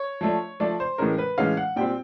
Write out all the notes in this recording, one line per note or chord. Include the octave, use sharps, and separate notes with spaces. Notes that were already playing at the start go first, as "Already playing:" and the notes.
Already playing: C#5
F3 A3 D4
F3 A3 D4 D5
C5
A2 E3 G#3 C#4 A#4
B4
A2 E3 G#3 C#4 F5
F#5
A#2 G3 C4 G5